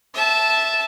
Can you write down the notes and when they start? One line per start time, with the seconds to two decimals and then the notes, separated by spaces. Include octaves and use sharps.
0.14 E5 A5